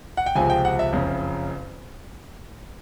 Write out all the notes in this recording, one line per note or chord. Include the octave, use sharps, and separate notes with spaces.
F#5
G5
C#2 C3 F3 G#3 C4 G#5
G5
F#5
E5
F#1 F2 C#3